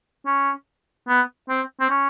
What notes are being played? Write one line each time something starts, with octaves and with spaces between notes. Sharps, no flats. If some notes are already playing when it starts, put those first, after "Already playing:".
C#4
B3
C4
C4
C#4